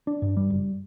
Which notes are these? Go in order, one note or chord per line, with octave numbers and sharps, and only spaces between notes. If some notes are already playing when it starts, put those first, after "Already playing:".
D4
G2
G3
F#1